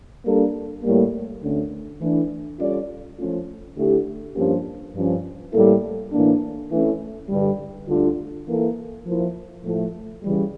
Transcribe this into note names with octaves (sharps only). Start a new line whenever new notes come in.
G3 A#3 D4 A4
A2 G3 A#3
D2 D3 A3 C#4
E3 A3 D4
G3 C#4 F4 A4 D5
F3 A3 C#4 F4
D3 A3 E4 G4
G2 F3 A#3 C#4 G4
G2 F3 C#4
A2 G3 A#3 E4 A4
A2 E3 A#3 D4
E3 A3 C#4
G2 D3 G3
D2 D3 G3 D4 F4
E3 A#3 E4 A4
F3 A#3 E4
A2 F3 A3
C#3 E3 G3